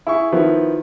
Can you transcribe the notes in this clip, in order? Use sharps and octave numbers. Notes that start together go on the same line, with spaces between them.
E4 G#4 C#6
D#3 F3 B3 E4